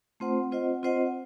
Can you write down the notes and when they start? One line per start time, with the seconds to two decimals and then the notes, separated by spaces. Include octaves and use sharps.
0.20 A3 C4 F4 C5 F#5
0.51 C4 F4 C5 D#5 F#5
0.83 C4 F4 C5 D#5 F#5